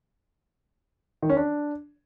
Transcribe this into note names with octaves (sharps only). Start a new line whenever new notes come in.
D#3
C#4
D4